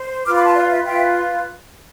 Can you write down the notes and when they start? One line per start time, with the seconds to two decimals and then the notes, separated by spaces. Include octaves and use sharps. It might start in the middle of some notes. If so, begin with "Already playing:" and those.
Already playing: C5
0.26 F4 B4 D6 F6
0.36 B5 D6
0.46 A5 C6
0.55 D5 F5
0.71 E5
0.84 F4 B4 E5 G5